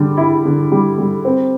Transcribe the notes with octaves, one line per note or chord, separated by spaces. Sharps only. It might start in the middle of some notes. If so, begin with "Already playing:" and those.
Already playing: D3 G3
E4
D3
G3
G3
C4